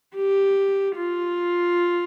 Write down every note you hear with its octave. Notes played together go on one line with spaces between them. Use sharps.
G4
F4